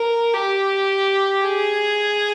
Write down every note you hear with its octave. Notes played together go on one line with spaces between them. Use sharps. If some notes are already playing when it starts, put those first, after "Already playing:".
Already playing: A#4
G4
G#4